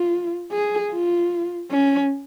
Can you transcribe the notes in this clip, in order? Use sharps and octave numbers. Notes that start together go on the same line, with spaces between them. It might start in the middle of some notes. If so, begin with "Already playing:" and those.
Already playing: F4
G#4
F4
C#4